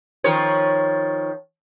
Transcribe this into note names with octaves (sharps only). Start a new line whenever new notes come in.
D#3 F3 C#5